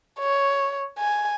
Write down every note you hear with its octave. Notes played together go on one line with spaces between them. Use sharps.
C#5
G#5